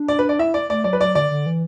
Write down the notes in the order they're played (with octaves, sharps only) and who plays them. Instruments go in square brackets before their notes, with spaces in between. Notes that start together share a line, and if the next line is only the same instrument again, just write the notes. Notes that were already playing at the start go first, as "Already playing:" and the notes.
Already playing: [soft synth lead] D4
[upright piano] D5
B4
D5
[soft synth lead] E4 [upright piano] E5
[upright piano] D5
[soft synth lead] A3 [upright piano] D5
[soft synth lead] F#3 [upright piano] D5
[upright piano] B4
[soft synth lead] F#3 [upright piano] D5
[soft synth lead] D3 [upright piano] D5
[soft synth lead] D3
E3